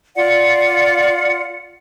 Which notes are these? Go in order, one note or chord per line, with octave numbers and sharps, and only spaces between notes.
F4 D5 F#5